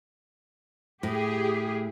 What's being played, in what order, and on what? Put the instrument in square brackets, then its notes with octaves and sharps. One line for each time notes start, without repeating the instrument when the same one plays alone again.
[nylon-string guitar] A2 [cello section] G4 G#4